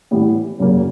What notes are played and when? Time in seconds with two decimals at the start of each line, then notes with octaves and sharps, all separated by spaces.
0.11 A2 E3 G3 B3
0.60 F#2 C#3 F#3 A#3 C#4